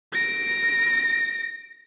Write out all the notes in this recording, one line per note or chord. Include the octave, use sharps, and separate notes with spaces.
A#6 D7